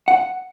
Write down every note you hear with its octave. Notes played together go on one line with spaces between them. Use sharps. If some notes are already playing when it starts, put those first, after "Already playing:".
F#5